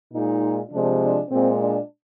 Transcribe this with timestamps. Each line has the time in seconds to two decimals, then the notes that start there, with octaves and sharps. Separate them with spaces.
0.13 A#2 G#3 D#4
0.71 C3 F3 G#3 D4
1.00 D4
1.29 A#2 G#3 C4
1.59 D4